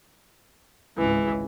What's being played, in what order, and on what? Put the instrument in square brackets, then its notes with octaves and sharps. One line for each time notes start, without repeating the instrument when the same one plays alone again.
[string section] G#1 C#2 [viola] E3